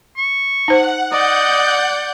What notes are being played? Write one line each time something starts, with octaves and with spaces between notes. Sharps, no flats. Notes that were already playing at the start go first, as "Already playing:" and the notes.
C#6
D#4 C5 F#5
D5 D#5 F#5 G6